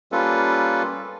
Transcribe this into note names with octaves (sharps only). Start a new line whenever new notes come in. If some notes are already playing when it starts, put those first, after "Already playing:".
G3 A#3 C#4 F4 A4 B4